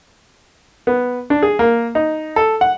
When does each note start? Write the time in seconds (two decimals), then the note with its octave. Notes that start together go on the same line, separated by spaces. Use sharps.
0.87 B3
1.30 D4
1.43 G#4
1.59 A#3
1.95 D#4
2.36 A4
2.61 F#5